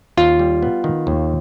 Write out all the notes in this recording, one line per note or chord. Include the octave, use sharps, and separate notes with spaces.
D#2 F4
G3
B3
D#3
D#2